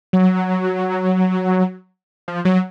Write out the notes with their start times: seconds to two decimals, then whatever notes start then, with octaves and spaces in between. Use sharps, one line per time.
0.13 F#3
2.28 F3
2.45 F#3